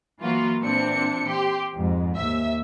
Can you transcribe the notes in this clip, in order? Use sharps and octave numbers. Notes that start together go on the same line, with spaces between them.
E3 F#3 A#3 F4 F#4
A#2 E3 C4 D4 C#7
G4 C6
F2 G#2
D#2 E5